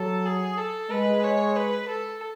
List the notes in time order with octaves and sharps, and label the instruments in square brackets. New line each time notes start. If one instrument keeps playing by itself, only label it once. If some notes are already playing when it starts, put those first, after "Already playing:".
Already playing: [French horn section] F#3 [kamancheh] A4
[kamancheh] G#4
A4
[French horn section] G#3 [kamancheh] B4
[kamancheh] C#5
B4
A4